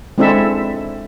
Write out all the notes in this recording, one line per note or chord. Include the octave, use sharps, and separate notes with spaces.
G#3 C4 D4 E4 A4 E5